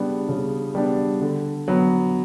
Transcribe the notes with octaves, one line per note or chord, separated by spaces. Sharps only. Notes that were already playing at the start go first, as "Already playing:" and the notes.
Already playing: C#3 G3 B3 D4
C#3
G3 B3 D4
D3
F#3 B3